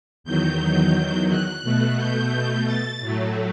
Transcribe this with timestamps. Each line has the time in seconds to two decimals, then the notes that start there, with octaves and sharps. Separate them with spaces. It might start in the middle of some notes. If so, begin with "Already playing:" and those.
0.24 E2 D#3 F#3 G6
1.28 F#6
1.63 B2 A3
1.98 G6
2.66 A6
3.00 A2 F#3 A3